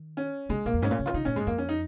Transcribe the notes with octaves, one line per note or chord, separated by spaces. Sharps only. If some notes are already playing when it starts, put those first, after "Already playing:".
Already playing: D#3
C#4
C#3 G#3
A#2 A#3
F2
G#2 C#4
A#2
C#3
D#3 F4
C#3 D#4
A#2 C#4
G#2 G#3
F2 A#3
C#4
D#4